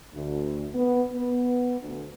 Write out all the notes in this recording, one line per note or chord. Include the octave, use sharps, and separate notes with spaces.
D2
B3
B3
D2